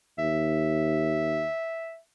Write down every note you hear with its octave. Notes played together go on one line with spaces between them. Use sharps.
D#2 E5